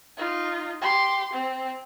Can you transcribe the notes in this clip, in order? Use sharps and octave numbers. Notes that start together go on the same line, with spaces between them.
D#4 F4
G4 C6
C4